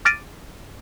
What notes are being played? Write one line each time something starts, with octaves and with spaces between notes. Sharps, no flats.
D6 F6 A6 A#6 D7 D#7